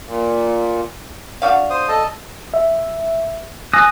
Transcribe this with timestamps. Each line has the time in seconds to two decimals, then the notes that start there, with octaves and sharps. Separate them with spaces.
0.06 A#2
1.42 D4 F#4 F5
1.70 C5 D#6
1.89 A4 D#5 A5
2.54 E5
3.73 G#5 D#6 E6 F#6 A#6